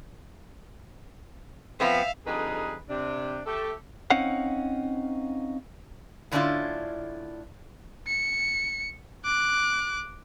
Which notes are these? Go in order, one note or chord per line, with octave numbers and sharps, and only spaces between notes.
F3 B3 C4 E5 F5
F2 D3 G3 D#4 G#4 B4
C3 D4
A3 G4 A4
C4 C#4 D#4 F5 F#5
A2 D3 C#4 D4 E4 F4
C#7
D6 F#6